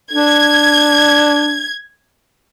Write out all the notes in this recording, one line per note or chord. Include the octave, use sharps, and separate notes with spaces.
D4 G#6